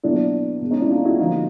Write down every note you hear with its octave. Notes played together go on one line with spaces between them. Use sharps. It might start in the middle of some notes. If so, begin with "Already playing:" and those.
B2 F#3 A#3 D4 E4
B2 G#3
C#4 D#4
D4 E4
D#4 F4
E4 F#4
D3 F3 A#3 D#4 F4